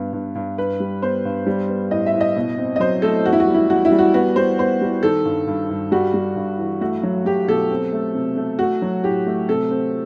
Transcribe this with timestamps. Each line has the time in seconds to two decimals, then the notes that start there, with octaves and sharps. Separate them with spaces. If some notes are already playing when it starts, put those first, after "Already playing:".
Already playing: G2 B3
0.13 G2
0.35 G2
0.58 G2 B4
0.80 G3
1.02 B3 C5
1.25 G2
1.47 G3
1.69 B3
1.91 A2 D#5
2.06 E5
2.13 A2
2.21 D#5
2.36 B2
2.58 C4
2.76 D#5
2.80 F#3 C5
3.02 A3 A4
3.25 E2 F#4
3.33 E4
3.40 F#4
3.47 G3
3.54 E4
3.70 E2 F#4
3.85 E4
3.92 G3
3.99 F#4
4.14 B3 F#4
4.36 G3 C5
4.59 B3 C5
4.81 G3
5.03 D#3 A4
5.25 G2
5.47 G2
5.70 G2
5.92 G3 F#4
6.14 G3
6.36 G2
6.59 E3
6.81 A3 F#4
7.03 F#3
7.25 F#3 G4
7.48 B2 A4
7.71 C4
7.93 A3
8.15 C3
8.37 A3
8.59 A3 F#4
8.82 F#3
9.04 A2 G4
9.27 A3
9.49 C3 A4
9.71 C4